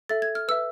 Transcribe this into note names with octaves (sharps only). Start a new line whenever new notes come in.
A4 E5 A6
G#6
F6
B4 E5 E6